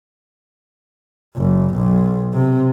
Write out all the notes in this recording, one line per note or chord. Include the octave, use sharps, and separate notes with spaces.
F#1
B1
C3